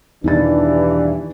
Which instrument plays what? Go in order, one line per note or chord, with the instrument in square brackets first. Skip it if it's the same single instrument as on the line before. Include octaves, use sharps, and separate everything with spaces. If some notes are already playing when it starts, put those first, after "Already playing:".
[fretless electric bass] E2 B2 [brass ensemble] G2 E3 [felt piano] D#3 D#4 A6 [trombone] D4